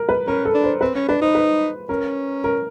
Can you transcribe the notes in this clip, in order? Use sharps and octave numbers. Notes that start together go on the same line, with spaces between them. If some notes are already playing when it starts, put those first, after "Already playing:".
Already playing: A#4
B4
C#4 A#4
A4
D4
C5
C4 B4
C#4
D4 B4
D#4 C5
B4
C#4 A#4
A#4